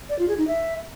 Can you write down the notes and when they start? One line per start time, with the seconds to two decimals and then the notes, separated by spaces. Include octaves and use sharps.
0.09 D5
0.19 F4
0.28 G#4
0.38 D#4
0.47 E5